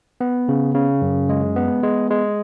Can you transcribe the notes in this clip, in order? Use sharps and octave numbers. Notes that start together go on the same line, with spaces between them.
B3
C#3
C#3
F#2
G#3
B3
G#3
G#3